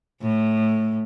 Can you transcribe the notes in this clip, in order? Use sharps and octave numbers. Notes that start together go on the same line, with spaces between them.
A2